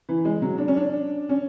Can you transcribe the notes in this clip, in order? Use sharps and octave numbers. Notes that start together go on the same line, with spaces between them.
E3
G#3
F#3
D4
C#4
D4
C#4